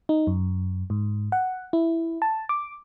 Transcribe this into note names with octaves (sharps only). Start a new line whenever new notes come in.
D#4
F#2
G#2
F#5
E4
A5
D6